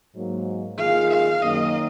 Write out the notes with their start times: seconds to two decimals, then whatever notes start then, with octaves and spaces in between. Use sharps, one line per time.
0.14 G#2 F#3 A#3
0.78 D#3 A#3 F4 G#4 F5
1.10 F5
1.42 F#2 D#3 A#3 D#5